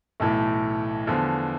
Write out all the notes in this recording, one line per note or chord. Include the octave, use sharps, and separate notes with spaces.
B1 A2 E3 A3
E2 D3 F3